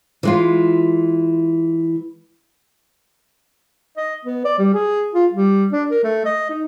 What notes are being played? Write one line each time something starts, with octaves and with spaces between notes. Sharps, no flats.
E3 G#3 F4
D#5
B3
D5
G3
G#4
F4
G3
D4
A#4
A3
D#5
D#4